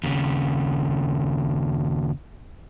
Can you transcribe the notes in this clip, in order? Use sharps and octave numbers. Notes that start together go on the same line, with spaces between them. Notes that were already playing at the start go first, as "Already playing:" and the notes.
D#2 C#3